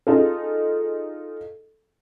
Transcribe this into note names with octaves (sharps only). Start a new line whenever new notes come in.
D#4 F4 G#4 A4